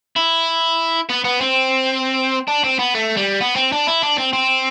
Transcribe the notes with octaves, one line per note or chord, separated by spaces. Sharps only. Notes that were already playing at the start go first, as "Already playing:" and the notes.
E4
B3
B3
C4
D4
C4
B3
A3
G3
B3
C4
D4
E4
D4
C4
C4